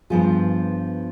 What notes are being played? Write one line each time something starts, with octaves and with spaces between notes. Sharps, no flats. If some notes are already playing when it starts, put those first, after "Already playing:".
G2 F3 B3 F4 G#4